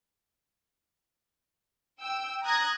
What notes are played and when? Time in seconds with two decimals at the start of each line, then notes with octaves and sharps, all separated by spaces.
2.01 G5 E6
2.43 A#5 D#6 F#6 G#6 A#6